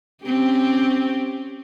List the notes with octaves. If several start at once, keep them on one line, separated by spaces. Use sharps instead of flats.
C4 C#4 G4